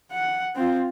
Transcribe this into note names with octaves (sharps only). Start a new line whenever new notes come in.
F#5
C4 F4